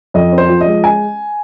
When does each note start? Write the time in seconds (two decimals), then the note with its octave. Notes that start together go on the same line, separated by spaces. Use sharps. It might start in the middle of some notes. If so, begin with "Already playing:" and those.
0.14 F2 D#5
0.32 C4
0.38 C5
0.49 F3
0.61 D#5
0.66 G#3
0.84 G#5